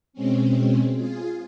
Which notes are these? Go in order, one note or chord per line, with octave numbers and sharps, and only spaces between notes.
B2 G#3 C4 C#4
F4 G#4